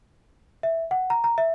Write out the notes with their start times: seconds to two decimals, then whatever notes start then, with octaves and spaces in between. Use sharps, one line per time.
0.63 E5
0.91 F#5
1.10 A#5
1.24 A#5
1.38 E5